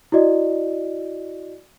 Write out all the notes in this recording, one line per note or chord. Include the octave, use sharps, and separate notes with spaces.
E4 F#4 D5 D#5